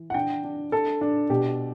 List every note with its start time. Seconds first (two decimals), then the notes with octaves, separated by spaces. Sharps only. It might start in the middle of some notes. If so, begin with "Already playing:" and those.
Already playing: E3
0.10 F#5
0.14 D4 G5
0.44 D4
0.72 D4 A4
1.01 D4
1.30 B2 G4